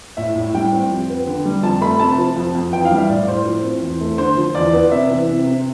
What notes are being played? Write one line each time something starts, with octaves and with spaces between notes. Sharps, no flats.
A2 E5
A2
G3 G5
C4
F2
B3
D3
G3
F2 A5
A3 B5
C3 A5
F3
F2
F2
E3 G5
F5
G3
E5
A2 D5
A2 C5
F3
C4
E2
A3
D3 C5
F3
E2 D5
B3
C3 E5
E3
C3
C3